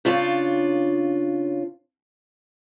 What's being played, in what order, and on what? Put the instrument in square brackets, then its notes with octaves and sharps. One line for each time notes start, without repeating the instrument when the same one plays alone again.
[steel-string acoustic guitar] C#3 D4 F4 C#5